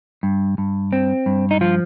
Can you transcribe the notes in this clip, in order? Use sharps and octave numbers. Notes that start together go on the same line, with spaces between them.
G2
G2
C4
G2
D#4
F3 F4